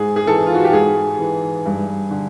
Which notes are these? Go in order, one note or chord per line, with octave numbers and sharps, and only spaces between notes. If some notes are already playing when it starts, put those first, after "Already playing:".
Already playing: G#2 G#4
G#4
E3 A4
F4
F#4
G4
G#2 G#4
E3
G2
D3